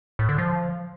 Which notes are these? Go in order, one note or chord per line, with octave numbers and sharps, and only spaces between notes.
A2
D3
F3